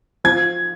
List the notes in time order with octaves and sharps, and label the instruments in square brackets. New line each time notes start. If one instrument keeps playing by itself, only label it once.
[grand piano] F3 G#6